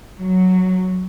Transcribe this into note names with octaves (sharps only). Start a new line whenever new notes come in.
F#3